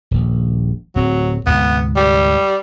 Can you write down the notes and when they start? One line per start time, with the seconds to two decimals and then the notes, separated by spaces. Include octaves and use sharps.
0.11 D#1 A#1
0.96 D1 F#3 C4
1.47 D2 G#2 C3 B3
1.96 G3